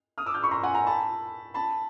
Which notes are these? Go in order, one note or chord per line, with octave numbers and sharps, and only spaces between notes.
D#6 F6
D6 E6
F6 G6
B5 C#6
A#5 C6
F#5 G#5
G#5 A#5
A5 B5
A5 B5